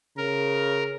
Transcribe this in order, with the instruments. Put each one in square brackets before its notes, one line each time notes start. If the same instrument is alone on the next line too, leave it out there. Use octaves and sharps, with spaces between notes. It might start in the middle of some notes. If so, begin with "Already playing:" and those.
[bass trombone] C#3 [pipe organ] A#4